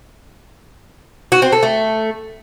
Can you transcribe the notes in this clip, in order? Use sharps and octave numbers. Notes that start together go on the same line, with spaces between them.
F#4
C4
A4
A3